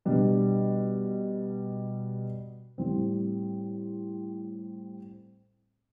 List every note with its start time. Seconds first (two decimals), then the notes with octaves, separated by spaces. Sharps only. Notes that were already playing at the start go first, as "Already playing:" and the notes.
0.05 B2 G3 D4
2.78 A2 G3 C4